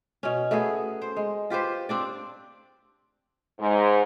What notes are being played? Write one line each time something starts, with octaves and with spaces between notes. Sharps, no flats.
B2 C#4
A3 B3 F#4 G#4
C5
G#3
F4 G4 B4 C5
C4 D4 D5
G#2